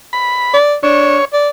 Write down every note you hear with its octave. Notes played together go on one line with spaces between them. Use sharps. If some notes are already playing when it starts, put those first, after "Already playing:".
B5
D5
D4 C#5
D5